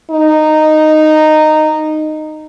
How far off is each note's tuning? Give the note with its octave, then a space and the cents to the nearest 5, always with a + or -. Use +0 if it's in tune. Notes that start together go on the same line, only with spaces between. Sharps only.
D#4 -10